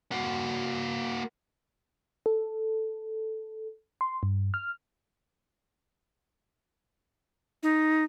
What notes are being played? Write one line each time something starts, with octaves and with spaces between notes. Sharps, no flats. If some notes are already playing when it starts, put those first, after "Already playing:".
A#3 F#4
A4
C6
G2
F6
D#4